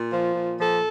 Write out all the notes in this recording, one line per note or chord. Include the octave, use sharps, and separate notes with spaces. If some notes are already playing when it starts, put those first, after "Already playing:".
Already playing: A#2
F3
A#2
F3 A4